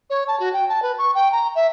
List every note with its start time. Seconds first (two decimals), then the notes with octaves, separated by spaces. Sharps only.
0.10 C#5
0.28 A5
0.40 F#4
0.53 G5
0.69 A5
0.82 B4
0.98 C#6
1.15 G5
1.32 A#5
1.55 E5